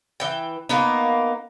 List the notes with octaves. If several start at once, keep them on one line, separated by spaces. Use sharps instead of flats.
E3 G5
A#3 B3 D#4